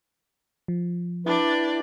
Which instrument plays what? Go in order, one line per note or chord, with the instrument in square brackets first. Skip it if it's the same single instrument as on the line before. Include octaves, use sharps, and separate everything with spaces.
[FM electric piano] F3
[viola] D4 D5 [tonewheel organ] E4 [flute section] B4 G5